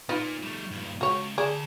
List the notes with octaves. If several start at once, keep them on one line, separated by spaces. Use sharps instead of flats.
A#2 D#4 F4 B4
G3 A3
G2 A#2
C#2 F#4 C#5
D2 G#4 D5 A5